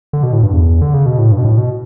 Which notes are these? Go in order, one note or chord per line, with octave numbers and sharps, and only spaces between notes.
D3
B2
A2
G2
E2
D3
C#3
B2
A2
G2
B2
A2
B2